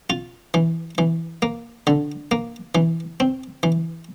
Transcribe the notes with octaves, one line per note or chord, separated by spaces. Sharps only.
F4
E3
E3
A#3
D3
A#3
E3
C4
E3